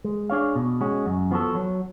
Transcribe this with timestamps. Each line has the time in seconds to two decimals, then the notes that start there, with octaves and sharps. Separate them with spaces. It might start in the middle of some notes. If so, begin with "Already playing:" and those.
0.04 G#3
0.30 D4 G#4 C#5 F5
0.55 B2
0.81 G#3 C#4 F#4
1.06 F#2
1.31 F3 B3 F#4 A4
1.55 F#3